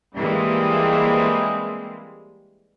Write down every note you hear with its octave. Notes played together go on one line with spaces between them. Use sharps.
E3 G3 G#3 A#3 C4